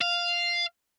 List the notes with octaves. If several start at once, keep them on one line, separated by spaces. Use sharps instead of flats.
F5